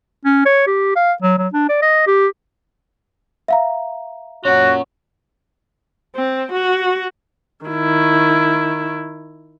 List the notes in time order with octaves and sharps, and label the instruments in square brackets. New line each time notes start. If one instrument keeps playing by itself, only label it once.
[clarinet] C#4
C#5
G4
F5
F#3
F#3
D4
D5
D#5
G4
[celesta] E5 F5 A#5
[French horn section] A#2 C#5 [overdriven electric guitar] C#4 F#5 [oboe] F#4
[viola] C4
F#4
D#3 E4